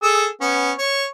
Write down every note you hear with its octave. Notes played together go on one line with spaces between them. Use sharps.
G#4 A4 E6
B3 C#4
C#5